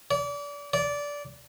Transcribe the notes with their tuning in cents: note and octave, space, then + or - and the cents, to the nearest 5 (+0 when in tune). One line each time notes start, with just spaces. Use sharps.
D5 -30
D5 -15